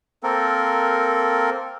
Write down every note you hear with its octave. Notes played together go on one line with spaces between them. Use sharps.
A#3 C4 A4 A#4